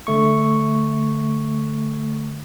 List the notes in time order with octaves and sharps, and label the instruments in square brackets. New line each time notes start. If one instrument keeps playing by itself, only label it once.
[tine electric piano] D3 A3 C#6